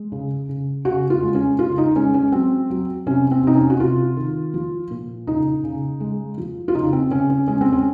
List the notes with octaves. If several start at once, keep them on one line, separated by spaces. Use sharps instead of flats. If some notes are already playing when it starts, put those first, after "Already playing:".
Already playing: G#3
C#3
C#3
C#3 F#4
F4
G#3
C#4
C#3 F4
D#4
G#3 C#4
C#4
F#3 C4
F#3
C3 C#4
C4
C3 D#4
C#4
F#4
C3 F4
D#3
F3
A#2
C#3 D#4
C#3
G#3
F3
F4
C#3 D#4
C4
C#3 C#4
C#4
G#3 C#4
C4
C#4